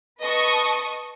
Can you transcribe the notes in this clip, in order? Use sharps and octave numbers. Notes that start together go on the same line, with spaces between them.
B4 D#5 A5 C#6 D#6